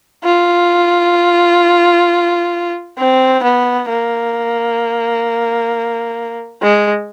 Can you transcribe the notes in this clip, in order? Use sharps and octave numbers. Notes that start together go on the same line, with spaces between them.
F4
C4
B3
A#3
G#3